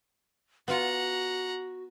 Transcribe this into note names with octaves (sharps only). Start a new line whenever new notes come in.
B3 F4 F#4 F#5 A#5